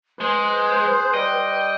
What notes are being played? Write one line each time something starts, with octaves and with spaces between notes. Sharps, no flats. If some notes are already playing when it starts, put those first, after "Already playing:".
G#3 G#4 B4 C5
G3 D#5 G5